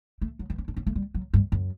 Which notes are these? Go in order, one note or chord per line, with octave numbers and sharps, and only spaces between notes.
A3
F#3
E3
C#4
D4
C#4
A3
G3
F#3
G2
F#2